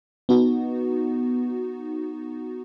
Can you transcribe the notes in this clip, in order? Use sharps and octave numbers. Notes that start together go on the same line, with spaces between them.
B3 D#4 F#4